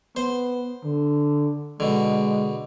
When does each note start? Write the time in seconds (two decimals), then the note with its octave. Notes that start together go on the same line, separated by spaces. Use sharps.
0.16 B3 C5
0.84 D3
1.80 B2 D3 G#3